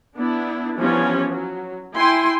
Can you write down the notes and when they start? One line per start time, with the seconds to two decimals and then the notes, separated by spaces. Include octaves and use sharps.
0.16 B3 D4 E4
0.77 E3 F3 G3 B3 C#4
1.29 F#3
1.96 E4 G5 G#5 C6